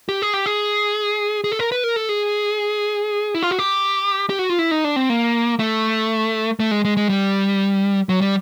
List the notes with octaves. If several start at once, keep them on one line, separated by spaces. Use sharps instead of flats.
G4
G#4
G4
G#4
G#4
A4
A#4
B4
A#4
A4
G#4
E4
F4
F#4
G4
G4
F#4
F4
E4
D#4
D4
C4
A#3
A3
A3
G#3
G#3
G#3
G3
F#3
G3